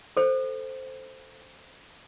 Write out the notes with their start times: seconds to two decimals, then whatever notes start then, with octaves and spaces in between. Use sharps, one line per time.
0.17 A4 C5